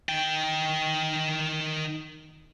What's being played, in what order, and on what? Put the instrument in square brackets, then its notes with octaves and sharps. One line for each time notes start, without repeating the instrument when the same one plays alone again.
[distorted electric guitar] D#3 G5